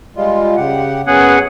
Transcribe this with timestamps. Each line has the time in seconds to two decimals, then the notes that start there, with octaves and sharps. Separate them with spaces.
0.17 G3 G#3 F4
0.57 C#3 G4 F#5
1.07 F#2 B3 C#4 G#4 F#5